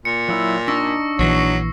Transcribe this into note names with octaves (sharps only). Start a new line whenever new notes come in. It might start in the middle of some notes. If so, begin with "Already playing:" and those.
A#2 C#7
F#3 E4 E6
D4 D#4 C#6 E6 A#6
A#1 E3 F#3 C7